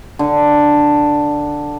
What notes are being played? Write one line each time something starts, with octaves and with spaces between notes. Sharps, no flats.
D3 D4